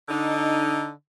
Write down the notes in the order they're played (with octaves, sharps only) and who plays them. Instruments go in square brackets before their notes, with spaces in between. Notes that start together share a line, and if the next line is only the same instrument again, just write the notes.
[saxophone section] D3 D#4